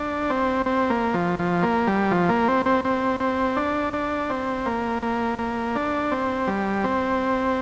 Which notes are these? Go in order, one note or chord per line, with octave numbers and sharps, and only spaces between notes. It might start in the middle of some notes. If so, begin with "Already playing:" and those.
Already playing: D4
C4
C4
A#3
F3
F3
A#3
G3
F3
A#3
C4
C4
C4
C4
D4
D4
C4
A#3
A#3
A#3
D4
C4
G3
C4